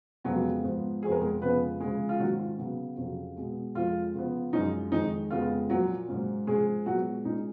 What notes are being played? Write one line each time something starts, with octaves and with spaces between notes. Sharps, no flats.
F2 C#3 F#3 G#3 B3 F#4
G#2 F3 B3
F2 F3 B3 G#4
A#4
G#3 G#4
F2 C#3 F3 G#3 B3 C#4 B4
C#3 F3 G#3 C#4 G#4
F4
G#2 D#3 F#3 A#3 C#4 F#4
F4
C#3 F#3 B3
F2 C#3 F#3
B2 G#3 B3
F2 F3 G#3 F4
C#3 F3 B3
F#2 F3 G#3 C#4 D#4
F2 D#3 G#3 D#4
F2 C#3 F3 G#3 B3 F4
A#2 F3 F#3 A#3 F#4
G#2 F#3 A#3 C#4
G#2 F3 G#3 C#4 G#4
A#2 F#3 G#3 B3 F#4
A#2 G#3 C#4 D#4